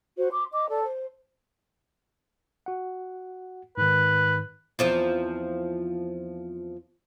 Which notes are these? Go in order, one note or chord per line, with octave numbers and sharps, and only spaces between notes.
F#4 C5
C6 D6
D#5 D6
A4 D5
C5
F#4 F#5
G#2 D#3 B4
E2 F3 C4